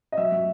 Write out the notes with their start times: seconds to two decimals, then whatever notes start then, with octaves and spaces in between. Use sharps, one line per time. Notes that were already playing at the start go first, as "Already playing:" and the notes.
0.12 D#5
0.17 F#3 E5
0.32 F#3